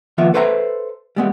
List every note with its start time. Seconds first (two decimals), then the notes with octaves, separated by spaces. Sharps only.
0.18 D#2 F3 B3 F4 E5
0.34 A4 B4 C5 E5 F#5 A#5
1.16 G3 G#3 B3